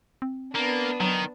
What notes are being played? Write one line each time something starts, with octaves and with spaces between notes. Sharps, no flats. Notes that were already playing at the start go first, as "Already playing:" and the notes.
C4
A#3 B3 D4
D#3 F#3